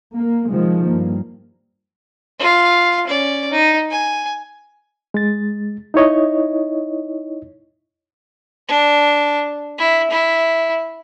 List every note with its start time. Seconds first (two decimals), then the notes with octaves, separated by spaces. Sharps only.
0.15 A#3
0.49 C3 D#3 F3 G#3
0.87 G2 A#3
2.39 F4 F5
3.07 C#4 D5
3.51 D#4
3.91 G#5
5.14 G#3 A6
5.94 D#4 E4 C#5 D#5
8.68 D4
9.78 E4
10.11 E4